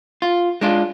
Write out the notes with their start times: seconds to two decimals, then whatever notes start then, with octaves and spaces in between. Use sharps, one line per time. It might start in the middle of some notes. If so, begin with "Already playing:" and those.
0.22 F4
0.61 G#3 D4 F4